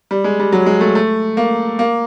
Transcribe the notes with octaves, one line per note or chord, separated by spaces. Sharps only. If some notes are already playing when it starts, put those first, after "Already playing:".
G3
G#3
G3
F#3
G#3
A3
A3
A#3
A#3